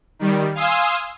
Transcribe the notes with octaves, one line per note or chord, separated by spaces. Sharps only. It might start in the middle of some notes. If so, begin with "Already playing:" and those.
D#3 G3
F5 G#5 C6 D#6 E6